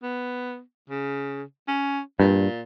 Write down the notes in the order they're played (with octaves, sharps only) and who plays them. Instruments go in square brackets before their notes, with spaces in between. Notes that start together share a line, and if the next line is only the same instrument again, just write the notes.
[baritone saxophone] B3
C#3
C#4
[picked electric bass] G2 [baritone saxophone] A#2